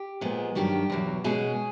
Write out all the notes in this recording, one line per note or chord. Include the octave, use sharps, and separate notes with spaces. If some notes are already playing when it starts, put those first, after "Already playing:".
Already playing: G4
A#2 F3 G#3 B3
G2 D#3 F#3 G4
E2 B2 F#3
B2 G#3 C#4 G#4